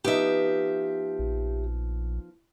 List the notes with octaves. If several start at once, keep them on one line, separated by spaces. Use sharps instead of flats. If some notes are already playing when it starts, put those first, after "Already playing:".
F3 B3 D#4 G4 E5
A#1